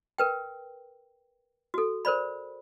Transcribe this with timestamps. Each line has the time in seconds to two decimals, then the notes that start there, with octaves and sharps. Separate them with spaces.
0.18 A#4 B4 G5
1.74 F#4 A4
2.05 A#4 C5 D5 B5